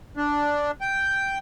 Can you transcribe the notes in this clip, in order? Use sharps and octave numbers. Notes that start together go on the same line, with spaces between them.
D4
G5